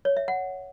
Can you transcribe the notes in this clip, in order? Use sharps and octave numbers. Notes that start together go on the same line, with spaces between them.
C#5
E5
F#5